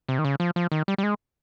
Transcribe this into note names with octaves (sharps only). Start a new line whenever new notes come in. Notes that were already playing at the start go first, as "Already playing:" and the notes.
C3
D#3
C#3
F3
F3
D#3
G3
G3
G#3